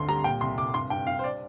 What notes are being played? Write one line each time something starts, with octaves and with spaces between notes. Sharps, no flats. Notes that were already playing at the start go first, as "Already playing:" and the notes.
Already playing: D2 G2 D3 C6
G3 A#5
A#2 G5
C2 C6
C2 D6
G2 C6
G2 G5
G2 F5
C5
D5